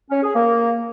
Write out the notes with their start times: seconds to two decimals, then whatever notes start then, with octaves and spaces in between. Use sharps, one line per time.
0.11 C#4
0.23 G#4
0.35 A#3